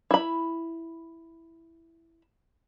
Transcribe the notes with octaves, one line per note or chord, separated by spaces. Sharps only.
E4 B5